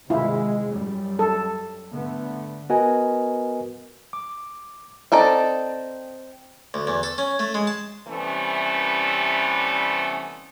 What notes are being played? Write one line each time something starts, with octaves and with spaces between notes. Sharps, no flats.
C3 D#3 G#3 E4 F4
F#2 G3
A4
D3 A3 B3
B3 F#4 A#4 B4 D#5 G#5
D6
C4 D#4 A4 D5
D2
E2
A4
C#4
A3
G#3
A5
C3 E3 G3 A3 B3 C#4